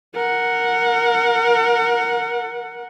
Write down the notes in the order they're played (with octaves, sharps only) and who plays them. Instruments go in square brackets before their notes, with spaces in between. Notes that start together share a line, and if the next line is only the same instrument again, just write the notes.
[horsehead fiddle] A#4 F#5